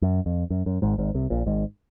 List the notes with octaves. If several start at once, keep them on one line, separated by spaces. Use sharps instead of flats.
F#2
F2
F#2
F#2
G#1 G#2
G#1 G#2
C2 C3
A#1 A#2
G#1 G#2